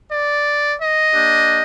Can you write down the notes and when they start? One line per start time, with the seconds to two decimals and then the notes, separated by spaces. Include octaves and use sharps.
0.09 D5
0.79 D#5
1.14 A#3 D4 G4